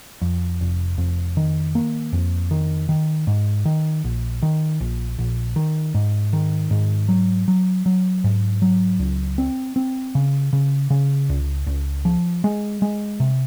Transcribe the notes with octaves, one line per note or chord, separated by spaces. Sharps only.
F2
F1
F2
D#3
A#3
F2
D#3
D#3
G#2
D#3
A#1
D#3
A#1
A#1
D#3
G#2
D#3
G#2
F#3
F#3
F#3
G#2
F#3
C#2
C4
C4
C#3
C#3
C#3
C#2
C#2
F3
G#3
G#3
C3